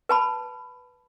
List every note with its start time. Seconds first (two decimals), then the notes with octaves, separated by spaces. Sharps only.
0.09 B4 A5 B5